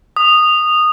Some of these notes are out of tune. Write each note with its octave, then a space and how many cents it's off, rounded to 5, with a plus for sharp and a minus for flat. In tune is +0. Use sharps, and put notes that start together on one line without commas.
D#6 -15